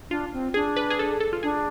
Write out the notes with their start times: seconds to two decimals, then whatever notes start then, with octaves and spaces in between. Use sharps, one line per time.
0.10 D4 F4
0.33 C4
0.54 D4 G#4
0.76 B4
0.90 G#4
0.99 A4
1.20 A4
1.33 F4
1.43 D4 G#4